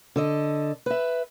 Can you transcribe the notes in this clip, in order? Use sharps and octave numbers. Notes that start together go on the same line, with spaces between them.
D3 A4 D#5
B4 E5